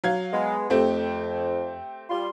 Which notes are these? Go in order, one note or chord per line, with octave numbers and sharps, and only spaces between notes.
F#3 F5 G#6
G#3 B3
F2 A3 C4 G4
G3 F4 C6